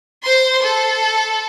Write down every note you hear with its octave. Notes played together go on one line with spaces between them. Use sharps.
C5 C6
A4